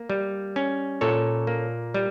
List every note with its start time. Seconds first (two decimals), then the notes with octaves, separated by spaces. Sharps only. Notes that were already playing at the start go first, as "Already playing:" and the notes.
Already playing: A#3
0.10 G3
0.56 C#4
1.01 A#2 A4 C#5
1.47 A#3
1.94 G3